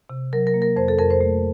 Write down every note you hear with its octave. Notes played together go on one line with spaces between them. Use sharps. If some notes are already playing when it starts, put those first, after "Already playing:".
C3
F#3 A#4
A#4
A#3
A#4
F2 C5
A4
F2 A#4
C5
A3